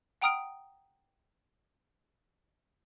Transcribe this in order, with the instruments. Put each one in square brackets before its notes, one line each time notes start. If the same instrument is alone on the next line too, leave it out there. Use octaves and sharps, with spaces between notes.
[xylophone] F#5 G5 A#5 D#6 F6 D7